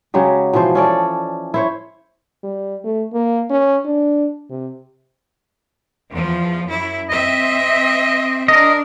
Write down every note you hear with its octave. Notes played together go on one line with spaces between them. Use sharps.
C#3 F#3 G#3 G4
B2 E3 F3 C5
C#4 A4 D5
E4 C5 C#5
G3
A3
A#3
C#4
D4
C3
E2 F3
F#2 E4
C4 D#5 E5
D4 A#4 D#5